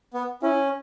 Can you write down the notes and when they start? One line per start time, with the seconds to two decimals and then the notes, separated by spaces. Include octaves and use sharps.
0.14 B3
0.43 C#4 E4